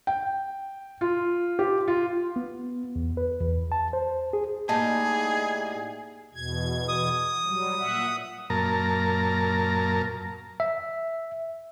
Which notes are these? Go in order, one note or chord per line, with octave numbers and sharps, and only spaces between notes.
G5
F4
G4
F4
B3
E2
B4
E2
A5
C5
G#4
A2 G3 A#3 D#4 G#4 A5
E2 B2 G#6
D#6
F#3 G3
A#2 E5 F#5
F#2 A#2 A#4 A5 A#5
E5